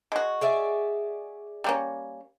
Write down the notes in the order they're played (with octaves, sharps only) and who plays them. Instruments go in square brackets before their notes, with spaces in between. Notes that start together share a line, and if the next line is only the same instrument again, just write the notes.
[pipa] G#3 F#4
[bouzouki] G#4 D5 E5
[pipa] G3 A#3 C#4